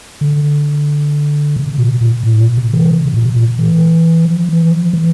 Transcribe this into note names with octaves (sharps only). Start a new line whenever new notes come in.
D3
C3
A#2
A#2
A2
A#2
C3
E3
C3
C3
A#2
A#2
E3
F3
E3
F3
E3